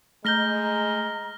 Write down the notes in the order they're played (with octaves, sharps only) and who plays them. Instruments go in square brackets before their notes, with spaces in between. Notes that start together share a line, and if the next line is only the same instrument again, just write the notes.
[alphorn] G#3 [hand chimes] A3 G6 [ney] A#5 [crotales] F6 A#6 G7